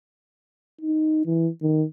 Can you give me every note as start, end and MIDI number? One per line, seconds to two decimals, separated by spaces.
0.82 1.23 63
1.26 1.48 52
1.62 1.84 51